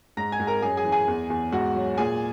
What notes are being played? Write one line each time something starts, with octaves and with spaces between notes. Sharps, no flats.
G#2 A#5 A#6
G#5 G#6
G#2
A#4 A#5
F#2 G#4 G#5
G#4 G#5
E3
G#4 G#5
E2
E2
G#2 F#4 F#5
F#3
A#2 G#4 G#5